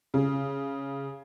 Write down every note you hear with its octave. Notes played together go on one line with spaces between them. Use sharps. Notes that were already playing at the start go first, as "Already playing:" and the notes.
C#3